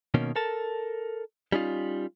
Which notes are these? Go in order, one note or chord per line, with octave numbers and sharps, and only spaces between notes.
B2 D#3 A#3 C#4
A4 A#4 A5
G3 C#4 D#4 F4